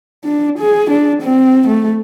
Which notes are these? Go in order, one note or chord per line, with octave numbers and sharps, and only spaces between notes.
D4
G#4
D4
C4
A3